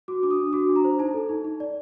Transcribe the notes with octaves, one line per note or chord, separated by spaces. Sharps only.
F#4 D6
D4 D6
D#6
D4
F#4 D6
D4
A#5
C5
D#4 A5
A4
D#4
D#4
D5